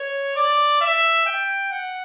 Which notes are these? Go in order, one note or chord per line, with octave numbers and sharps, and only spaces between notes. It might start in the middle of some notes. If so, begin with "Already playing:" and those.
Already playing: C#5
D5
E5
G5
F#5